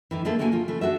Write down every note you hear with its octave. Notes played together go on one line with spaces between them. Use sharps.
D2 D#3 E3
B2 D3 A3 A#3 G#4 A4
B2 D3 A#3 F#4 G5 G#5
F3 F4
C#3 E3 A3
D4 F#4 G#4 E5